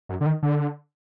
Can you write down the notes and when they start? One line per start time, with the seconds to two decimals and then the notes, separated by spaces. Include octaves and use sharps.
0.09 F#2
0.21 D3
0.26 D#3
0.43 D3